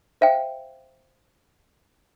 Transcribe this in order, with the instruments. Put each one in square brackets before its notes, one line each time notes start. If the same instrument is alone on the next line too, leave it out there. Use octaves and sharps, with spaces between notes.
[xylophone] C5 E5 F5 G5